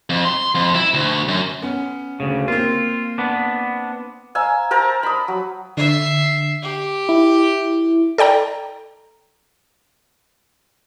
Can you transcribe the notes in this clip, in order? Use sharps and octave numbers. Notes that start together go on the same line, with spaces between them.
F2
C6
F2
E4
D2
F#2
B3 C#4
D2 C#3
A#3 C4 F4
B3 D4
F5 G#5 A#5 E6
A#4 C5 A5 A#5
B5 D#6
F#3
D3 E5 C7
G4
E4
A4 D5 G5 A#5